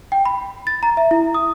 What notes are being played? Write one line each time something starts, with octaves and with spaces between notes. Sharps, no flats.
G5
B5
A6
A#5
E5
E4
D#6